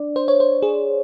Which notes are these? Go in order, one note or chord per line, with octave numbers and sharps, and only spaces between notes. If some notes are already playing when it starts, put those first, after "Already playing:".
Already playing: D4 D5
C5
C#5
C5
G#4